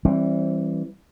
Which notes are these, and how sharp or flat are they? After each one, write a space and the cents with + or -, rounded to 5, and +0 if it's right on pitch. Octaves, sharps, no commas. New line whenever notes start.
E3 +0 G3 +0 C4 +30